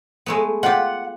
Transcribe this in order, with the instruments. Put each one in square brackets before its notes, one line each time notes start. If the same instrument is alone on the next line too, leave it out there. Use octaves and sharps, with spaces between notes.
[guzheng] G#3 A3 B3
[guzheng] F4 G4 [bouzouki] F#5